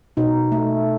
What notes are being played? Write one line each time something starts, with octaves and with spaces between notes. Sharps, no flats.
B2 D#4
A3